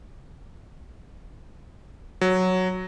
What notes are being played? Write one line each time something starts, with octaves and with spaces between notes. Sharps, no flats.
F#3